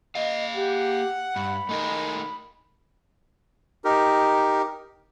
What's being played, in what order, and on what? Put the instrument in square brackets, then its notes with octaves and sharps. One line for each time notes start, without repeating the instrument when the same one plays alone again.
[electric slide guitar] A#3 G#4 F5 [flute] D#5
[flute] G4 [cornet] F#5
[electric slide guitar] G2 [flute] B5
[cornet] G#3 [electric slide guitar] A3 D#4 A#4
[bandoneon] D#4 G4 A#4